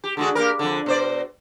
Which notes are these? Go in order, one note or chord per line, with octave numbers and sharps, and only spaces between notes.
G4
D3 G#3 F#4
A#3 G4 A#4
F2 D3
B2 C5 D5